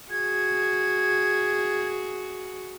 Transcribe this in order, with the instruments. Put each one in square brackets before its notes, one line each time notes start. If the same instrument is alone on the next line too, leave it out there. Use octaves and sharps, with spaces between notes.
[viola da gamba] F#4 G#4 [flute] G#6